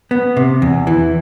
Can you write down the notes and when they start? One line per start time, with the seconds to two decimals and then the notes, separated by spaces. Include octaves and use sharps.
0.11 B3
0.37 C3
0.62 E2
0.87 E3